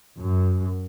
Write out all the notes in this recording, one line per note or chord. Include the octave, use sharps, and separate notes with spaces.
F#2